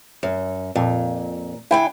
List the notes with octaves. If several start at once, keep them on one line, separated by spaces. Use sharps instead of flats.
F#2
F2 A#2
D3 E4 G5 G#5